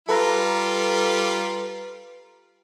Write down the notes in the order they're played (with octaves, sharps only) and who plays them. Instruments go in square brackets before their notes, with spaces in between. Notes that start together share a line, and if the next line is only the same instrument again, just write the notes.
[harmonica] G3 F4 [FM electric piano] A4 B4 A#5